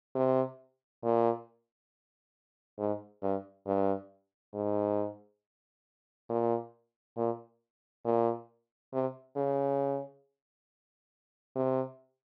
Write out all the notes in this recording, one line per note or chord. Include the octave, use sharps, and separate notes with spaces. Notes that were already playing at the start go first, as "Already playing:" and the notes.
C3
A#2
G#2
G2
G2
G#2
A#2
A#2
A#2
C3
C#3
C3